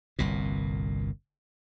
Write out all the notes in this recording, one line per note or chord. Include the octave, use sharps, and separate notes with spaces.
G1 C2 A#2